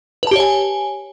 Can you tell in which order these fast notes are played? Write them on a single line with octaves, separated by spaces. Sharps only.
B4 A5 G4 C#5 G#5